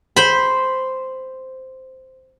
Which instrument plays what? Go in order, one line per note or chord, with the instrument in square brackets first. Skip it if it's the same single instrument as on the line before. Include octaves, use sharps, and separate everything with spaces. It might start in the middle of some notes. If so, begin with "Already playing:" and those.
[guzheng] C5 B5